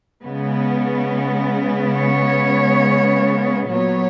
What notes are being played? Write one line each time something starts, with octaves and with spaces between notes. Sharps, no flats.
C#3 G#3 B3
C#5
A#2 F#3 B3 C#5